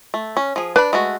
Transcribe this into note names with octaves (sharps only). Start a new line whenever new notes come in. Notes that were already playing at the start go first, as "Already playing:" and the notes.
A3
C#4
F3 G#4
D4 B4 B5
G#3 A3 F#4